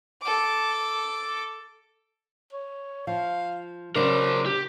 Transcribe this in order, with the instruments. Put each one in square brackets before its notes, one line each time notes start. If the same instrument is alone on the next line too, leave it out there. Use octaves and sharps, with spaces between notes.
[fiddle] A4 D6
[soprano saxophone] C#5
[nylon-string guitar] F3 [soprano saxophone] F5
[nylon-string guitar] C#3 F#3 D4 [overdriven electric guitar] A#4 C5 [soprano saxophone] D6
[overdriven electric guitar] G4